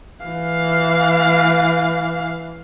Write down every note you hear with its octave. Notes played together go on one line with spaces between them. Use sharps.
E3 F5